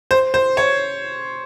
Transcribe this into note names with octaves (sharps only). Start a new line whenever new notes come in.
C5
C5
C#5